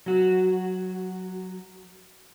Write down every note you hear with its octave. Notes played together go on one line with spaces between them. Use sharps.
F#3 F#4